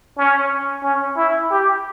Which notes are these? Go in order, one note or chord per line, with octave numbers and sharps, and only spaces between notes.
C#4
C#4
E4
G4